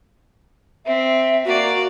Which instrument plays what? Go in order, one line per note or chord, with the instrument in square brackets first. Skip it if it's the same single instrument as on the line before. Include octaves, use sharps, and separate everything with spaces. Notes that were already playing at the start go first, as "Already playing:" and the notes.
[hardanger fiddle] C4 [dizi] E5
[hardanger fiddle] A#3 D5 [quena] F#4